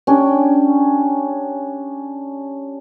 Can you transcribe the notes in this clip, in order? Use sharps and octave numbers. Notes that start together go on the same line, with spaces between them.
C#4 D4 G4